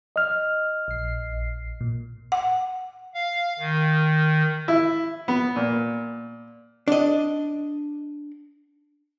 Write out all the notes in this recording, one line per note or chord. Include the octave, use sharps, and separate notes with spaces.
D#5 F6
A#1 C7
A#2
F#5
F5
D#3
E4
B3
A#2
D4 D#5